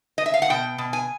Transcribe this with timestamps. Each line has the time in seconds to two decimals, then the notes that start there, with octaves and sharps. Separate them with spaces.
0.18 D#5
0.26 E5
0.34 F5
0.42 F#5
0.50 B2 G5
0.78 B2
0.93 G#5